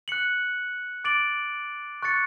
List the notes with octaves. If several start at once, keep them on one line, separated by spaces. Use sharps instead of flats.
F#6 C#7 F#7
D6 A6 D7 F#7
C#6 F#6 A6 C#7